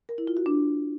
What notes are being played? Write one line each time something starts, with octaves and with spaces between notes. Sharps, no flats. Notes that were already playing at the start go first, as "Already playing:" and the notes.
A#4
E4
F4
F#4
D4